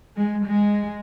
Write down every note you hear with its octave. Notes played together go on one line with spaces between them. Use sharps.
G#3
G#3